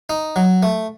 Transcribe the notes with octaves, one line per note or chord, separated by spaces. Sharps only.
D#4
F#3
A3